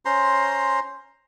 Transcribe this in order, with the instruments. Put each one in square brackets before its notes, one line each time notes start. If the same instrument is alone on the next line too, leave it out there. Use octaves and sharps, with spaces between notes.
[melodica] C#4 C5 A#5 C6